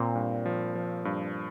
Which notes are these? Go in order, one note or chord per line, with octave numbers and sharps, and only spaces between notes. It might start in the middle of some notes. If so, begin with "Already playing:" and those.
Already playing: A#2 C4
G2
F3
F3
G2